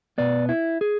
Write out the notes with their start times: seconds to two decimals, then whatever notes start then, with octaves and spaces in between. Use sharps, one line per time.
0.18 B2 B3 D5
0.49 E4
0.81 G#4